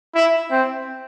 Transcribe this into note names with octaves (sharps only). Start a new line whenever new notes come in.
E4
C4